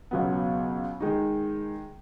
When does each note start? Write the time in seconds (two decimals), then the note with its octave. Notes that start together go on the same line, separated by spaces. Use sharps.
0.11 C#2 B2 F#3 B3
1.00 D#3 G#3 D#4